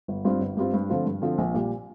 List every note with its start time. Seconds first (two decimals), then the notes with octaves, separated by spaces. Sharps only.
0.08 G1
0.25 G2 G3 C4 F4
0.41 G1
0.57 G2 G3 C4 F4
0.73 G2
0.90 D3 F3 C4 F4
1.06 G2
1.22 D3 F3 C4 F4
1.38 A#1
1.54 A#2 G3